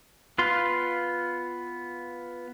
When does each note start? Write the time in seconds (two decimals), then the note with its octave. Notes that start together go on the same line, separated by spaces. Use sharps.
0.38 B3 F4 C6